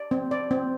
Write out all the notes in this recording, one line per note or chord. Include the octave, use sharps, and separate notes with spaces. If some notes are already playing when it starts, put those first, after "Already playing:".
Already playing: D5
C4
D5
C4